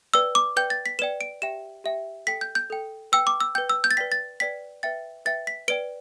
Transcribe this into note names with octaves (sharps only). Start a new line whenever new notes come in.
B4 D5 G5 E6
D6
B4 D5 G5 G6
A6
B6
B4 D5 G5 E7
D7
G4 E5 G5 E7
G4 E5 G5
A4 G5 B6
G6
G6
A4 G5
B4 G5 E6
D6
E6
B4 G5 G6
E6
G6
A6
B4 D5 G5 B6
A6
B4 D5 G5 B6
B4 E5 G5 A6
B4 E5 G5 A6
B6
B4 D5 G5 D7